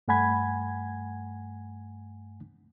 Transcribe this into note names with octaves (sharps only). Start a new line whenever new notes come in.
G2 A3 F#5 G#5 B5 G#6